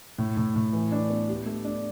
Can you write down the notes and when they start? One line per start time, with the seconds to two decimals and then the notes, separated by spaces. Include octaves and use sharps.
0.18 A2
0.37 A2
0.56 A2
0.73 E3
0.92 D4
1.10 B3
1.28 G4
1.46 A3
1.65 D4